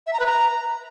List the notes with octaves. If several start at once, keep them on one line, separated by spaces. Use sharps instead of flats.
E5
A#5
B4
A#5